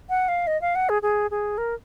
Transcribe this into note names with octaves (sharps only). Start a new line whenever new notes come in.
F#5
F5
D#5
F5
F#5
G#4
G#4
G#4
A#4